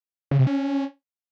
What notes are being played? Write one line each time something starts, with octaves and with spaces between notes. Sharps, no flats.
C#3
C3
C#4